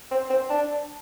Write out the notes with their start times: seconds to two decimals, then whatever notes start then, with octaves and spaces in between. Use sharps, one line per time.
0.11 C4
0.30 C4
0.50 D4